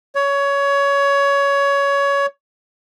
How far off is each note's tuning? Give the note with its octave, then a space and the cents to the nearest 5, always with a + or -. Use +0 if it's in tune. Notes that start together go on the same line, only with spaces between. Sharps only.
C#5 +20